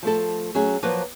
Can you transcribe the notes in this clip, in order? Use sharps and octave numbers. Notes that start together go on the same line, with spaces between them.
F3 A3 A4
F#3 A3 C#4 G#4
F3 F#3 A#3 B4